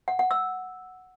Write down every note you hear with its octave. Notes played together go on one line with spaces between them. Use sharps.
F#5
F#5
E6